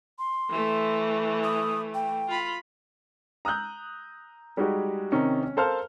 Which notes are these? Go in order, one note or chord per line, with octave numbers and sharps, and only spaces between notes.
C6
E3 A3
D#6
G5
F4 B5
A#5 D#6 E6 F#6 G6
G3 G#3 D#4 F#4 G4
C3 D#3 C4 C#4 D#4
C#4
A4 A#4 C5 F5 A5 F6